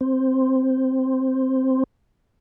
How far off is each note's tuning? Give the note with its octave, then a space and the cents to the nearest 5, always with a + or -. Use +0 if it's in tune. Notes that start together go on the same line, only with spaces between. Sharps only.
C4 +0